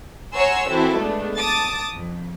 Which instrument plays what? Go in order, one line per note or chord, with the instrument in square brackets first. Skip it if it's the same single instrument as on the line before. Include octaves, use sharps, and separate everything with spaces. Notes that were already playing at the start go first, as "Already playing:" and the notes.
[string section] C#5 F#5 G#5 A#5 C6 E6
E3 C4 E4 F#4 A4
G#3 A3 B3 D4
A5 D6 D#6 A6
F2